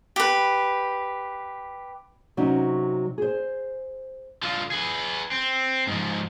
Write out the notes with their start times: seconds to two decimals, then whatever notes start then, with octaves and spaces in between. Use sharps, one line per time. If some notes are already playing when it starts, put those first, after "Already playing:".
0.16 G4 B4
2.37 C3 F#3 C#4 D#4
3.18 G#4 C5
4.43 D3 F4
4.71 G#4 B4
5.31 C4
5.87 G#2 F3